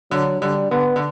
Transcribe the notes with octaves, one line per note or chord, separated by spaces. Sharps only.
D3 F#3
D3 G3
D3 B3
D3